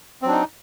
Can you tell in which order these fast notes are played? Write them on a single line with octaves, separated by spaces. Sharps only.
C4 F#3 D4 D#4